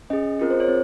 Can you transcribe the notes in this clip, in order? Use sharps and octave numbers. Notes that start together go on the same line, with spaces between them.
C#4 G#4 D#5
C4 F4 G#4 A#4
C5
C#5
C4